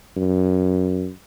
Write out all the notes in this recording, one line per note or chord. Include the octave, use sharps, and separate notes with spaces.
F#2